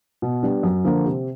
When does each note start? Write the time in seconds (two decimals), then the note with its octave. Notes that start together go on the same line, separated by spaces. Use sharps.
0.22 B2
0.43 G3 B3 D4
0.63 F#2
0.84 D3 F3 A#3
1.06 C3